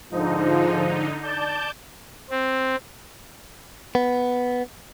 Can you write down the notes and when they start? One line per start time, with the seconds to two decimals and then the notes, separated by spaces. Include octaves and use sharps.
0.12 G#2 D3 F3 D#4
1.23 D5 A5 G6
2.30 C4
3.95 B3